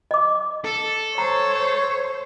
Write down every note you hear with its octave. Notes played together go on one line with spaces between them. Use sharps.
D#5 D6
A4
C5 C#5 A#5